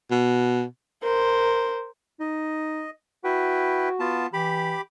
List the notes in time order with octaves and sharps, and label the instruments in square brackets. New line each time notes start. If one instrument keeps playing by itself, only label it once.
[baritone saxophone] B2
[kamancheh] A#4 C5
[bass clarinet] D#4 [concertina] D#5
[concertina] E4 B4 G5 [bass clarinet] F#4
[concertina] B3 F4 A5
[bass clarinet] E3 [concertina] G4 B5 D6